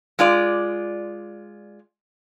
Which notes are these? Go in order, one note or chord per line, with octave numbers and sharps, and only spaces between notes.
G#3 F4 D5